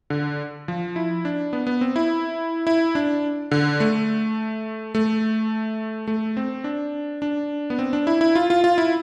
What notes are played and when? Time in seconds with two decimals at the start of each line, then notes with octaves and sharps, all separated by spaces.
0.10 D3
0.68 F3
0.96 E4
1.25 D4
1.53 B3
1.67 B3
1.81 C4
1.96 E4
2.67 E4
2.95 D4
3.51 D3
3.80 A3
4.95 A3
6.08 A3
6.37 C4
6.64 D4
7.22 D4
7.70 B3
7.79 C4
7.93 D4
8.07 E4
8.21 E4
8.35 F4
8.50 F4
8.64 F4
8.78 E4